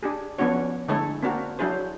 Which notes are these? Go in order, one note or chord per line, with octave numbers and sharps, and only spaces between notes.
D4 G4 G#4
F3 B3 C#4 D4 F#4 C#5
D3 G#3 A3 E4 A4 C#5
A#3 C4 D4 F#4 A#4
F#3 D4 E4 G#4 C5